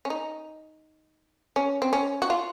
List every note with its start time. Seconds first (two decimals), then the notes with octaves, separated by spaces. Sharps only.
0.05 C#4
0.10 D#4
1.56 C#4
1.82 C4
1.93 C#4
2.22 F#4
2.30 F4